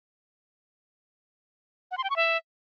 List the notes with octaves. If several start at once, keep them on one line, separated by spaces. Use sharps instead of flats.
F#5
C6
G5
C#6
E5